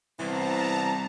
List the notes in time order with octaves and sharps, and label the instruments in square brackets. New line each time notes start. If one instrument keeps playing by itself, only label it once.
[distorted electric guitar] C2 [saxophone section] E3 B3 C4 [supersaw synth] A5 A#5